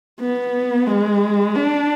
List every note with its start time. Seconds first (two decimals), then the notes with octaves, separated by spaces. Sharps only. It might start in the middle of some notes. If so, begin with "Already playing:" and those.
0.20 B3
0.87 G#3
1.55 D4